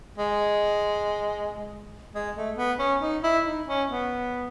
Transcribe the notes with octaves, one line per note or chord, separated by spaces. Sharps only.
G#3
G#3
A3
B3
C#4
D#4
E4
D#4
C#4
B3